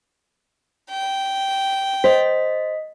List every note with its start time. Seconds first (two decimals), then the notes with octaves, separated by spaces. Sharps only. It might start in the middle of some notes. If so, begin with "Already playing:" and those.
0.90 G5
2.04 C5 D#5 B6